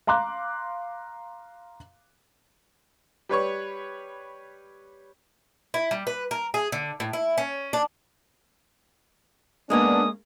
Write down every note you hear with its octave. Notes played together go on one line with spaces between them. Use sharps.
F5 A#5 C6 D6 F#6
G3 B4 C#5 C#6
E4
G3
B4
A#4
G#4
D3
A2
E4
C#4
D4
G#3 A#3 B3 C#4 D4 D#6